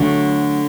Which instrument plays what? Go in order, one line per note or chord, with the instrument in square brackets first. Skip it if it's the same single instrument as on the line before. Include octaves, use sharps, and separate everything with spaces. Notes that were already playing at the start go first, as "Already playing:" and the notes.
Already playing: [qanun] D3 F#3 A3